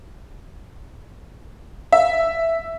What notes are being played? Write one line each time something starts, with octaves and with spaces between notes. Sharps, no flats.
E5